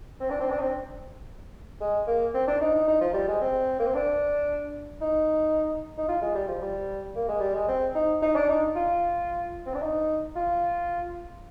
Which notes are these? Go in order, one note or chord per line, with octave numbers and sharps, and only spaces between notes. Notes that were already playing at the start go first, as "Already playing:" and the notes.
C4
D4
C4
D4
C4
G#3
A#3
C4
D4
D#4
D#4
D#4
F3
G3
G#3
C4
A#3
C4
D4
D#4
D#4
F4
G#3
G3
F3
G3
A#3
G#3
G3
G#3
C4
D#4
D#4
D4
D#4
F4
C4
D4
D#4
F4